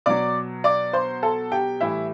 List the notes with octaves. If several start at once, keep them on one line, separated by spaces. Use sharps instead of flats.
B2 F#3 D5 D6
D5 D6
C5 C6
A4 A5
G4 G5
A2 E3 G3 E4 E5